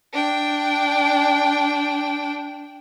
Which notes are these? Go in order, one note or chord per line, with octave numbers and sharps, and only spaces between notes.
D4 G5